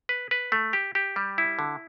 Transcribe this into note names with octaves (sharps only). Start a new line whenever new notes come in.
B4
B4
A3
G4
G4
G3
E4
D3